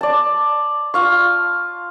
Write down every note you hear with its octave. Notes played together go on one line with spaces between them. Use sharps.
D5 A5
F4 F5 C#6